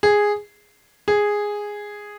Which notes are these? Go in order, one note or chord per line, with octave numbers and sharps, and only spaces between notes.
G#4
G#4